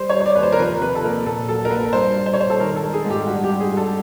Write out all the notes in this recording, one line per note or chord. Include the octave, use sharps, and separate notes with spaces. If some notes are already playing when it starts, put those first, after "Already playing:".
Already playing: G3 C5
C#5
G3
C#5
D5
D#2 B4
C5
A#4
F3 B4
C3 B4
A4
A#3 A#4
A#2 A4
F#3 A4
A#4
A#1 B4
G2 C5
G2
C5
C#5
G3 C5
A4
D#3 A#4
A4
G#3
G#4
G#2
G4
G2 F#4
G4
G2
G#4
G2
A4